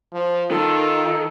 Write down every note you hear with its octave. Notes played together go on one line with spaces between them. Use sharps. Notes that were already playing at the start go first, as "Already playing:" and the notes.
F3
D#3 F4 A4